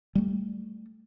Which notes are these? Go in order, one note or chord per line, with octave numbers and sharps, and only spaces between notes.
G3 A3